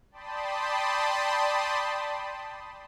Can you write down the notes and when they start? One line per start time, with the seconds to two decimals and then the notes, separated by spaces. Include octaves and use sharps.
0.11 D5 G5 A5 B5 C6 D#6